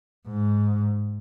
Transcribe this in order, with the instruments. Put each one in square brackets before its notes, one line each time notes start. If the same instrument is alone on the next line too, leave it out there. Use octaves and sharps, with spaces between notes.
[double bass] G#2